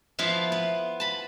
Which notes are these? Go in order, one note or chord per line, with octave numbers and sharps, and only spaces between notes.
F3 B3 E4 F4 F5
B3
A5 B5